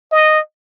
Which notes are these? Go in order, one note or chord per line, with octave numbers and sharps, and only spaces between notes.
D#5